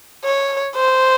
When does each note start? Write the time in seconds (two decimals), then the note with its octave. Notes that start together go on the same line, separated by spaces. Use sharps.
0.24 C#5
0.76 C5